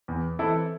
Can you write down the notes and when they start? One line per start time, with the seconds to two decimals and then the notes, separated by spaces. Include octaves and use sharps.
0.08 E2
0.39 E3 C4 E4 A4